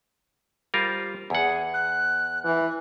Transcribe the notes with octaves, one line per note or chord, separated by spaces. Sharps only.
G3 F4 A#4 C5
E2 G#4 F#5
F#6
E3 F#6